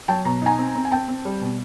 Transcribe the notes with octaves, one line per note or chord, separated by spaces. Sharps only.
F#3 G5 A5
B2 A#5
D#4 G#5 A#5
C4
C4
G#5
C4 G5 A5
C4
G3
B2